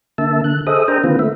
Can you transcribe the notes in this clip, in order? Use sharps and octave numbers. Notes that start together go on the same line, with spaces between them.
D3 A#3 E5 A5
D3 F#6
G#4 A4 C5 D#5 E5 D#6
D4 G#4 A#4 C5 G5 A#5
D3 D#3 A#3 C4 F4 B4
A3 E5